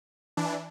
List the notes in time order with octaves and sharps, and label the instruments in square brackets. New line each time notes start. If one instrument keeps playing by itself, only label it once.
[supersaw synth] E3 D4